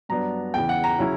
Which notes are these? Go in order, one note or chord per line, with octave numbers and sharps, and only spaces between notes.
G2 F#3 B3 D4 A#5
E2 C#3 E3 G5
F#5
A#5
C#3 F#3 C#4 E4